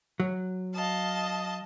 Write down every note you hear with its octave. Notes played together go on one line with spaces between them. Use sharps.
F#3
D#5 F5 A5